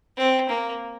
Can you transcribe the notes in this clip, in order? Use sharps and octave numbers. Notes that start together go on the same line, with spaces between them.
C4
A#3